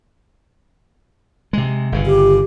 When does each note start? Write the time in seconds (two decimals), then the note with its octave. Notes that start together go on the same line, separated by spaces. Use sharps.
1.53 C3 G#3
1.92 G1 C#3
2.06 G4